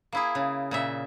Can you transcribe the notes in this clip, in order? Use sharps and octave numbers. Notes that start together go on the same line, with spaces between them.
A#3 E4 G#4
C#3
A#2 C#3 E5